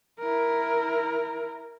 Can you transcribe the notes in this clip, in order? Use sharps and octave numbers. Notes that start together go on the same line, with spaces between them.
E4 A#4